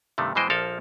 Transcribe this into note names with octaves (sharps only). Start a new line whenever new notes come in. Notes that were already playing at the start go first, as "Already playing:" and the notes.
G2 C3 D#3 A3
B2 E3 G#3 C5 D#5 G5
A#1 F3 A4 A#4 F5